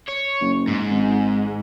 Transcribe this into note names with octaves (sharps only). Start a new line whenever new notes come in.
C#5
F#1
G#2
G#1